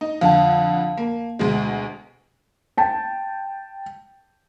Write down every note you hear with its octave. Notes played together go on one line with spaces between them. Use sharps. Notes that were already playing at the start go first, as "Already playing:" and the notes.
D#4
F2 D3 F5 A5
A#3
D2 B2 G#3
G5 A5